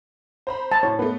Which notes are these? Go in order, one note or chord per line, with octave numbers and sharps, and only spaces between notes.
C5 A#5 B5
A5
A2 C#5
A3 B3 B4